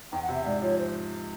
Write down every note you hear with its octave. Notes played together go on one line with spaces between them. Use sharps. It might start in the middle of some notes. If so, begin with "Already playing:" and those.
E2 G5
F#5
C3
E5
G#2 D5
F3 C#5
C5